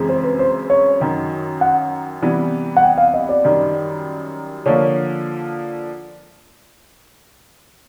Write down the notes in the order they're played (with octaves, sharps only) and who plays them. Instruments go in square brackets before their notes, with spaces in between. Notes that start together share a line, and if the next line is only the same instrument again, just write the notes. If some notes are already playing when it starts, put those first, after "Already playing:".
Already playing: [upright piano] F#2 C#3 E3 G#3 C4
[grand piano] C5
B4
C5
C#5
[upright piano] F#2 D#3 F#3
[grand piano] F#5
[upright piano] C3 E3 G3 B3
[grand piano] F#5
G5
F5
D#5
D5
[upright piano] F#2 D#3 G3
[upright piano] D3 F3 A#3 [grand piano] C#5